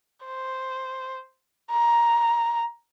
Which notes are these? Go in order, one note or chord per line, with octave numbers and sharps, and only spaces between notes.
C5
A#5